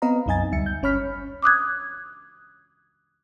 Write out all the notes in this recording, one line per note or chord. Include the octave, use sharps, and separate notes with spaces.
B3 C4 B4 D#5 F5 A#5
C2 F#2 D#4 D#5 G#5 A6
D2 G3 E5 C#7
G6
G1 C#4 C#5 B5 F6 B6
D6 D#6 F#6 G#6